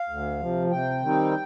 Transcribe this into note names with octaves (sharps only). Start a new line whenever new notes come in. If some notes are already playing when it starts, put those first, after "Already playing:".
Already playing: F5
D2
C3 F3
C3 G5
D#3 G3 C4 D#4